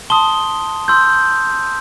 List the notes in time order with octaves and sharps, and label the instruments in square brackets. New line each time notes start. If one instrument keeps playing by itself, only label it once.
[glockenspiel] A5 C6 D#6 G7
C6 E6 G6